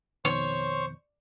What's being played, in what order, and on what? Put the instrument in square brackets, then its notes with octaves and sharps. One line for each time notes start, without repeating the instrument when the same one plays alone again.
[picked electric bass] F2 B2 D#3 [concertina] C5 C#6 [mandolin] C#5